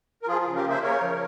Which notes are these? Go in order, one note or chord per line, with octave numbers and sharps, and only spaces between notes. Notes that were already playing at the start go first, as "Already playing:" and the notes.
A#4
F3 F4 G#4
F4 G#4
C#3
G4 A#4
A#3 C5 E5
C#3 A#4 C#5
F3